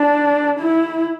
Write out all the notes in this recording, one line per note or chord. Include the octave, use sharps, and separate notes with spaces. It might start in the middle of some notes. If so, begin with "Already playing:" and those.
Already playing: D4
E4